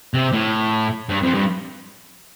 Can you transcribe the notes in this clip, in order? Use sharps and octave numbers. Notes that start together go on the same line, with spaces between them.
C3
A2
G2
F2
G2